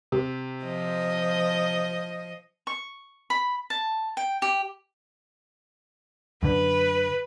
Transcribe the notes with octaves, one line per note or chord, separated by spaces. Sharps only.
C3
F3 D#5
C#6
B5
A5
G5
G4
F#2 D3 B4